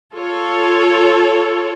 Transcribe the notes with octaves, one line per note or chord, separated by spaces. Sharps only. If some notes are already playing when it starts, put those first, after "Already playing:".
F4 A4 C#5